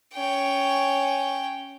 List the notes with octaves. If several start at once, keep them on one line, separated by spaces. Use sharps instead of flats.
C#4 G5